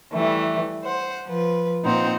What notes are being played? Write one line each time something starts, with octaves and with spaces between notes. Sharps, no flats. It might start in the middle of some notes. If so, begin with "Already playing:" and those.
E3 G3 A3
C5 F#5
F3 B4
A#2 C4 D#4 C5 F#5